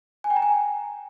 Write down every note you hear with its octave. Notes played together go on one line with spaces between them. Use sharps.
G#5
G5
A#5
G#5